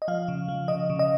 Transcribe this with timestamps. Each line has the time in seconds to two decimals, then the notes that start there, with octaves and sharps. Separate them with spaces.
0.02 D#5
0.08 F3 F5
0.28 C#3
0.48 F3
0.68 C#3 D#5
0.90 C#3
0.99 D#5